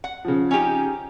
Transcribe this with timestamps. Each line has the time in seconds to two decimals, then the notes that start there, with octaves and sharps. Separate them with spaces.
0.04 F#5
0.25 C#3 F3
0.51 C#4 D#4 G4